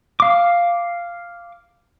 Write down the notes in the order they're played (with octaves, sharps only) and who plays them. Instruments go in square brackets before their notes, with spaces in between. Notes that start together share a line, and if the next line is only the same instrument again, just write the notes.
[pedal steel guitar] F5 D6